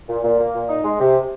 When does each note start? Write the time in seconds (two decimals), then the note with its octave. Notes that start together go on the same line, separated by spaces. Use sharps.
0.09 A#2
0.24 A#2
0.39 A#3
0.54 A#2
0.69 D#4
0.84 G#3
0.99 C3